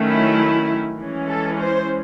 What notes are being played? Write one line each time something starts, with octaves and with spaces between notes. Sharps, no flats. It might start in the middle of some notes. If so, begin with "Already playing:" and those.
Already playing: D#3 F#3 A3 C#4
E4
E3 G#3 C#4
A4
C5